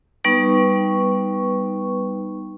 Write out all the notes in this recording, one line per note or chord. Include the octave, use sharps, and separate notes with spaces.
G3 B3 D#4 B4 C#6